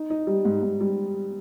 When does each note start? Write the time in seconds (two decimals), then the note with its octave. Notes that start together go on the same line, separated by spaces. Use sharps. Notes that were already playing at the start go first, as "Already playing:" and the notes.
Already playing: D#4
0.10 D#4
0.27 G3
0.45 G#2
0.63 G#2
0.81 G3